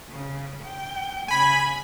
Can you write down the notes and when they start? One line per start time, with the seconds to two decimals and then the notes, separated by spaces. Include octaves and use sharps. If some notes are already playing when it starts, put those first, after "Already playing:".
0.11 C#3
0.63 G5
1.28 C#3 G#5 B5